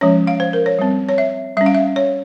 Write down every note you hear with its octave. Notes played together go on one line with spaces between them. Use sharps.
F3 G#3 C#4 C#5
F5
C5
A#4
C#5
G3 C4
C#5
E5
G3 C#4 E5
F5
E5
C#5